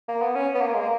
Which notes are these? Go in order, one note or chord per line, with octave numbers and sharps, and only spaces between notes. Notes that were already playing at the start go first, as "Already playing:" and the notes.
A#3
B3
C#4
B3
A#3
G#3
A#3